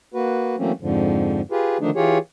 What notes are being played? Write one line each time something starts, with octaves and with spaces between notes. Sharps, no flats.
A#3 F#4 B4
E3 F#3 A3 A#3 C4 C#4
F2 G#2 D3 F3
F4 G4 G#4 B4
D3 D#3 F3 A3 D4 D#4
E3 F4 G4 G#4 C#5